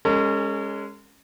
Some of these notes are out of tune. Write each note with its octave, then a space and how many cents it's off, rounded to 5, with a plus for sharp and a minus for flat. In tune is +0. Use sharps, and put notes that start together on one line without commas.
G#3 -15 C#4 +0 A#4 -45